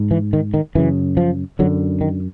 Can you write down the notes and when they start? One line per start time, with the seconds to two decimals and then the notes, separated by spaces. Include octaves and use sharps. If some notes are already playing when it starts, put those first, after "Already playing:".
Already playing: G#2
0.11 E3
0.33 D#3
0.54 D#3
0.75 F#2 C#3 E3
1.17 F3
1.59 D3 F#3
1.63 F#2
2.01 D#3